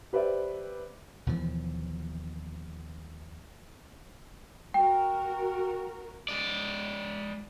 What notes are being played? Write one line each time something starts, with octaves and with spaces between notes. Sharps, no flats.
G4 B4 C5 D5 E5
D#2 B2 E3 F3
F#4 A#4 G5
G#3 D5